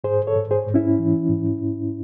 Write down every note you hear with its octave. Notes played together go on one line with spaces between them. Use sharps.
G#2 G#4 C5
A4 C#5
G#2
G#4 C5
G#2
C#4 E4
E3
G#2
G#2